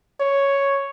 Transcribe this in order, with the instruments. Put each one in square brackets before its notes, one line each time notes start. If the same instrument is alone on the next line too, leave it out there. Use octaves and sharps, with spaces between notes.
[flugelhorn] C#5